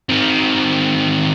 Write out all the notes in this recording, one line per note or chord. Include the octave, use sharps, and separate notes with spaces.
D#3 C4